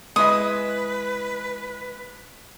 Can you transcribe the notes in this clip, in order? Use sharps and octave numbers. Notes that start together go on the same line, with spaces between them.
G#3 E4 B4 D#5 D#6